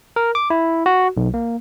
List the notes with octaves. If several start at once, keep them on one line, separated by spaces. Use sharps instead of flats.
A#4
D6
E4
F#4
B1
A#3